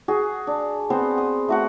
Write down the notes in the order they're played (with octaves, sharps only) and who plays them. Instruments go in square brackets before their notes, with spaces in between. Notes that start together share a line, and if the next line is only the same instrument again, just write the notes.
[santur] F#4 G#4
D4
B3 C4 C5 C6
D#6
A3 F#4 F#5